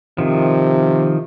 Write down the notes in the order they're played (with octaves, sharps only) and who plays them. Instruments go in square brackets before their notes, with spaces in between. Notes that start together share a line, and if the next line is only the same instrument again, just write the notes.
[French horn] C3 [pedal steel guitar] D#3 F3